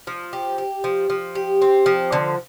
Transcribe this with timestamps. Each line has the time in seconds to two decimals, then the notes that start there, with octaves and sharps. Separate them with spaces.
0.07 F3
0.33 G4
0.58 G4
0.84 F3
1.10 F3
1.35 G4
1.61 C4
1.86 F3
2.12 D3